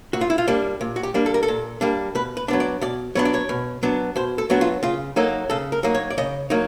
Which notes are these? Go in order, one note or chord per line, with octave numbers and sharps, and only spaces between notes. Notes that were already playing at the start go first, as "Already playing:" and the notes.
A#2 F#4
F4
E4
F4
G3 A#3 D4
A#2
F#4
G4
G3 A#3 D4
A4
A#4
A4
A#2
G3 A#3 D4
B2 B4
B4
F#3 B3 D4
D5
B2 D5
F#3 B3 D4 C#5
D5
C#5
B2
F#3 B3 D4
B2 C5
A4
F#3 B3 D4 F#4
F4
C#3 F4
F#3 A#3 D#4 A4
C#3 A4
A#4
F#3 A#3 D#4
C#5
D5
C#3 D#5
F#3 A#3 D#4